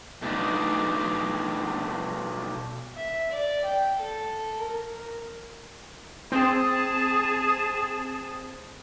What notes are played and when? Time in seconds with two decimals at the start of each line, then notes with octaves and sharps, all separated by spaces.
0.22 B2 A3 B3 D4 D#4
2.97 E5
3.31 D5
3.65 G5
3.99 A4
4.58 A#4
4.95 A#4
6.32 C4 G#4 A5 D#6